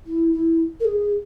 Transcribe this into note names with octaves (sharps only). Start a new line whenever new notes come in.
E4
E4
A#4
G#4